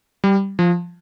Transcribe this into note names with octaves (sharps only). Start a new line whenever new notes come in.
G3
F3